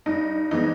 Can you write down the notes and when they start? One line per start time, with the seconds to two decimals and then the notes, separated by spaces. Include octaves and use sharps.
0.06 G2 D#4
0.51 E3 G#3 B3 D#4